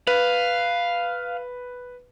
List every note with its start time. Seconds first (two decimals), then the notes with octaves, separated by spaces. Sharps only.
0.07 B4 F5